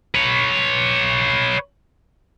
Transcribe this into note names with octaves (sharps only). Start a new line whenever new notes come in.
B4 C#5